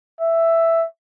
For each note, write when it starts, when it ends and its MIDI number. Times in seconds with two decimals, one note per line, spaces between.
0.21 0.86 76